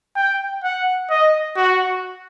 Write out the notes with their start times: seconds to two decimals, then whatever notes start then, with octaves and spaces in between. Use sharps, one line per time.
0.16 G5
0.64 F#5
1.10 D#5
1.57 F#4